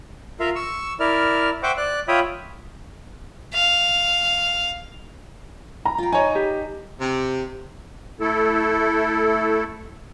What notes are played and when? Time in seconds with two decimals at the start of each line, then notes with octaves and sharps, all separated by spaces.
0.40 F4 A#4 E5 F5
0.56 C#6 E6
1.00 E4 A#4 D5 F6
1.63 C5 E5 F#5 G5 C#6 D6
1.77 D5 F#6
2.08 F4 C#5 E5 G5 B5 D#6
3.54 F5
5.85 A#5 B5
5.98 F4 G5
6.12 D#4 C#5 G#5 A5
6.35 G4
7.00 C3
8.20 A3 E4 A4